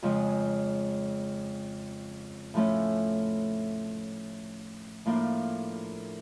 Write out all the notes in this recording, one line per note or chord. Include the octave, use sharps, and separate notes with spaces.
F2 C#3 F3 G#3
A2 F3 A3 C#4
A2 F3 A#3 D4